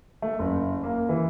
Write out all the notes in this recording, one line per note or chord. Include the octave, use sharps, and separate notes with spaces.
A3
F#1
A#3
E3